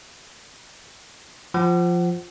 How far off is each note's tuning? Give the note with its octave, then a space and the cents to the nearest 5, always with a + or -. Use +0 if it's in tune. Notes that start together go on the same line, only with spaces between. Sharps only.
F3 +0 F#5 +25